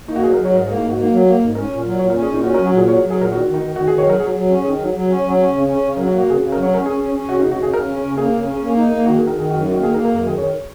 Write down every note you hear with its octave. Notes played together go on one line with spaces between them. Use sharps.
A#3 D#4
F#4
F#3 G#4
F#3 A#4
C#5
G#2 A#4
A#3 G#4
G#2 D#4
F#4
A#3
F#3
A#3
G#2
C#4 A#4
A#2
F#3
A#2 C#5
C#4 A#4
G#4
A#2 D#4
C#4 F#4
F#3 A#4
F#4
A#2 G#4
F#3 C#5
F#3
G#4
A#2 A#4
D#3 F#4
D#3
D#4
D#3
D#3 F#4
D#3 G#4
C#5
F#3 A#4
F#3 G#4
F#3
C#4
D#3 G#4
F#3
F#3
C#4
F#3
C#4
C#3
C#4
C#3
F#3 A#4
F#4
A#3
F#4
C#3 G#4
C#3
F#3 A#4
C#5
C#4 A#4
C#4 G#4
C#4
C#4
C#3 F#4
C#3 D#4
F#4
C#3 G#4
C#3 A#4
C#4
C#3
A#3 G#4
C#3
C#4
A#3
D#4
A#3
D#3 F#4
D#3 G#4
A#4
D#3 G#4
F#2 F#4
F#4
D#3
F#4
A#3 G#4
A#3 A#4
A#4
F#2
A#4
D#3 G#4
D#3 C#5